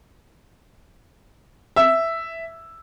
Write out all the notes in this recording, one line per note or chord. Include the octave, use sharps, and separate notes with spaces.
E5 E6